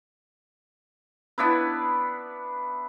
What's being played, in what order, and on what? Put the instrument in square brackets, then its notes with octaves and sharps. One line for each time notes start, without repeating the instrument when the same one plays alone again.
[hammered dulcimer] B3 D4 E4 B4